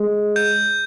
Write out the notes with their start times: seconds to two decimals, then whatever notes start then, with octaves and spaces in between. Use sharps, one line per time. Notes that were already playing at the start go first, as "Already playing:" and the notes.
Already playing: G#3
0.36 G6